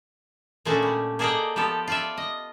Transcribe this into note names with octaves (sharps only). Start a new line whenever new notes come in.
A#2 G#3 A3 C#4 D4 F#4
G3
A#3 G#4 A4 D5 D#5 G5
F3 B3 G4 A4
F4 D5 E5
D#5